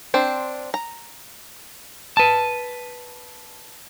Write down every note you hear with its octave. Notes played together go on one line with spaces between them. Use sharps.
C4 D4 C5
A#5
B4 A5